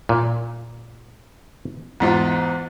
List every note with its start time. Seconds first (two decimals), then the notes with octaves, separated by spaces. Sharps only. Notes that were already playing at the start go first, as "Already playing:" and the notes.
0.09 A#2
2.00 E2 G#2 F4